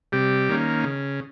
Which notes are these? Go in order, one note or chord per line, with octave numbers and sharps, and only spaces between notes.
C3 G3 G4
D#3 A#3 C#4
C#3